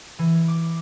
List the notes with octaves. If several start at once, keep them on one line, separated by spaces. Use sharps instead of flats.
E3
D6